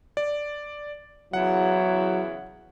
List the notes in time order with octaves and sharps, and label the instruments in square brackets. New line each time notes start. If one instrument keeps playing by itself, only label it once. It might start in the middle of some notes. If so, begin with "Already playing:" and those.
[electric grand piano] D5
[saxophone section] E2 C#3 E4 [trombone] F#3 [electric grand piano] F#5